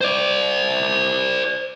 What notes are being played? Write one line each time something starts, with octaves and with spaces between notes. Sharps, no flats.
C5 D5